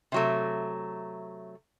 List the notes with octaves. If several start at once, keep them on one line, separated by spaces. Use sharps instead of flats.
C3 F#3 A3